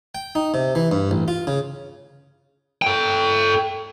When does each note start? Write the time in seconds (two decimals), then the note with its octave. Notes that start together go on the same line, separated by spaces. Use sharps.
0.15 G5
0.35 D#4
0.54 C3
0.75 E3
0.92 G2
1.11 A1
1.28 F4
1.47 C#3
2.82 A4 G5